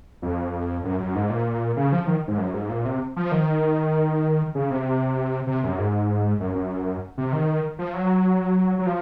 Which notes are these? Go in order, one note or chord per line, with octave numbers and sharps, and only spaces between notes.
F2
F#2
F#2
G#2
A#2
C#3
F3
D#3
G#2
F#2
G#2
A#2
C3
F3
D#3
C#3
C3
C3
F#2
G#2
F#2
F#2
C3
D#3
F3
F#3
F#3
F3